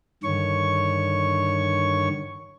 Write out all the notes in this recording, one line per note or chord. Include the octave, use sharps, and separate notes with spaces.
G2 D3 D#3 C#5 C#6